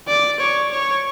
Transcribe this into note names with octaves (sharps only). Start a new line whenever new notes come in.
D5
C#5
C#5